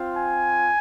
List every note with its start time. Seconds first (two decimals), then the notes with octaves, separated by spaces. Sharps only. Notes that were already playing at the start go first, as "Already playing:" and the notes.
Already playing: C4 F4
0.17 G#5